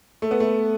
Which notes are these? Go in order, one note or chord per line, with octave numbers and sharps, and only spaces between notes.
A3
B3
A3